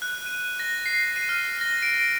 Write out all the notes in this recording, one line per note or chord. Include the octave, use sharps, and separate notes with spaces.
F#6
D#7
A#6
C7
D#7
F6
A#6
D7